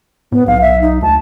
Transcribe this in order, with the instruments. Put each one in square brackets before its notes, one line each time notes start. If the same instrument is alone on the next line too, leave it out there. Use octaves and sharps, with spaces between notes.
[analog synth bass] A2 [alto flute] B3
[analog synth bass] B1 [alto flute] F5
[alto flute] E5
D#4
[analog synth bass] D2 [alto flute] A5